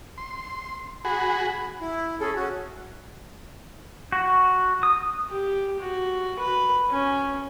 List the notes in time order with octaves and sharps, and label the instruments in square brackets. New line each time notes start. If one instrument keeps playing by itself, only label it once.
[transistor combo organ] C6
[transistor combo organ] F#4 G#4 [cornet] B5
[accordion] E4
[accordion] C#4 A4 [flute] G#4
[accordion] C#4 [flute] F#4
[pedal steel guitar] F#4
D#6
[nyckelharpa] G4
F#4
B4
C#4